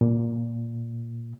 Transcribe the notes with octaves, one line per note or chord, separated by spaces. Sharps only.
A#2